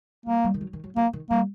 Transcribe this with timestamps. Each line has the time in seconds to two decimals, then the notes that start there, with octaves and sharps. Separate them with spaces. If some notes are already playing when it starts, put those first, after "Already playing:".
0.26 G3 A#3
0.44 G3
0.54 D#3
0.61 F#3
0.73 D#3
0.84 F#3
0.96 F#3 A#3
1.13 D#3
1.30 G3 A#3